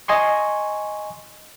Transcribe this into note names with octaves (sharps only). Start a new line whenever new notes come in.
D#5 G#5 C6 C#6